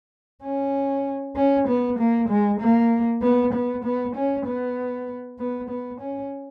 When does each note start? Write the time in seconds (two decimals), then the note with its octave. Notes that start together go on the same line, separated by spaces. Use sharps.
0.43 C#4
1.36 C#4
1.68 B3
1.99 A#3
2.29 G#3
2.60 A#3
3.23 B3
3.53 B3
3.84 B3
4.16 C#4
4.46 B3
5.39 B3
5.70 B3
6.01 C#4